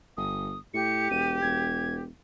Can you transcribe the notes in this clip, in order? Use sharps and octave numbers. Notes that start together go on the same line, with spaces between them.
G1 D#6
A2 G4 C#7
E1 D#7
E1 G#6